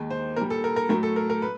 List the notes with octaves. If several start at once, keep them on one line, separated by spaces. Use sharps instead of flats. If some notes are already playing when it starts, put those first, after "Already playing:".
Already playing: D#2 D#3 G#3
C5
A#2 G3 A#4
A4
A#4
A#4
A2 F#3 A3 A#4
A4
A#4
A#4
B4